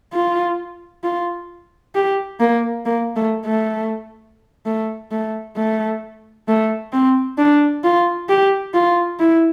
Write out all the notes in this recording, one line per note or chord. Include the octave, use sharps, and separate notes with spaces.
F4
F4
G4
A#3
A#3
A3
A3
A3
A3
A3
A3
C4
D4
F4
G4
F4
E4